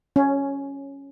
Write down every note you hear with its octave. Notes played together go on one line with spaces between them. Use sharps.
C#4